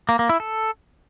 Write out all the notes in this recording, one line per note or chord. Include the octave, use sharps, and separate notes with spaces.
A#3
A#3
E4
A4